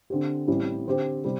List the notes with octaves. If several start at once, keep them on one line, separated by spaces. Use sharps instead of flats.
D3 C4 G4
A1 A2 G3 C4 E4
D3 C4 G4 C5
C3 G3 C5